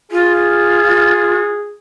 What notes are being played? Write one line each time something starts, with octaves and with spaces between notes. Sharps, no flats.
F4 G#4